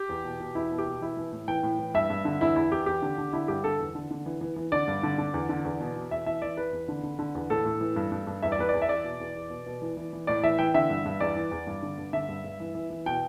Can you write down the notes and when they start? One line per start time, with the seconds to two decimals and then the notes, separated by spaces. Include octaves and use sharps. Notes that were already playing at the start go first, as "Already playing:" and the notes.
Already playing: G4
0.09 E2
0.24 B2
0.40 B2
0.55 E2 E4
0.71 B2
0.78 G4
0.86 B2
1.01 E3 E4
1.17 E3
1.32 A2
1.48 E3 G5
1.63 A2
1.79 E3
1.94 G2 E5
2.10 G2
2.25 D3
2.41 E2 E4
2.56 E2 E4
2.71 E2 G4
2.86 E2 G4
3.02 D3
3.18 D3
3.33 D3 E4
3.48 G2 G4
3.64 D3 A4
3.80 E2
3.95 D3
4.11 D3
4.26 E3
4.41 E3
4.56 E3
4.72 D3 D5
4.88 G2
5.03 D3
5.18 D3
5.34 E2
5.49 D3
5.65 E2
5.80 B2
5.96 B2
6.11 E2 E5
6.26 E3 E5
6.42 E3 D5
6.57 E2 B4
6.73 E2
6.88 D3
7.03 D3
7.19 D3
7.35 E2
7.50 A2 A4
7.65 A2
7.81 E3
7.96 G2
8.12 G2
8.27 G2
8.42 E2 E5
8.52 D5
8.59 E2 B4
8.69 E2 D5
8.82 E5
8.89 E2 D5
9.04 B2
9.20 E2
9.36 E2
9.50 B2
9.66 B2
9.82 E3
9.97 E3
10.13 E3
10.27 A2 D5
10.44 E3 E5
10.59 E3 G5
10.74 D3 E5
10.90 G2
11.05 G2
11.20 E2 D5
11.36 E3
11.51 E2
11.67 G2
11.83 D3
11.98 G2
12.13 D3 E5
12.28 G2
12.44 G2
12.60 E3
12.75 E3
12.90 E3
13.06 B2 G5